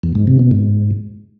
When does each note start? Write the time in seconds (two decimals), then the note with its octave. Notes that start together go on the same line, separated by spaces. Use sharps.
0.03 E2
0.15 G#2
0.27 C3
0.39 B2
0.51 G#2